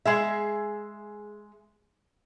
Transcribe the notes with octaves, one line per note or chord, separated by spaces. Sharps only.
G#3 G#4 E5